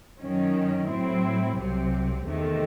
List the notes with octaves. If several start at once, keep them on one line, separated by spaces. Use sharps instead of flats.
F#2 D#3 F#3 C#4
A2 F#3 C4 E4
C2 C3 F#3 C4
E2 C3 D#3 A3